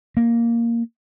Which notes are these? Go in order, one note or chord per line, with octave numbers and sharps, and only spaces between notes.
A#3